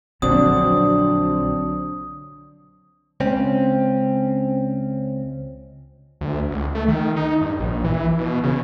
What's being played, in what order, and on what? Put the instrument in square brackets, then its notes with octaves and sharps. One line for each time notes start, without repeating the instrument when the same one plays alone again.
[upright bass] A#1 [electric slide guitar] D3 F#3 F#4 [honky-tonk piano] C4 D4 [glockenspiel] D#6
[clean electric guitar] C#2 C4 C#4
[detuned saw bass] D2
C#2
A3
D#3
D#4
G2
A#1
E3
B2
C#3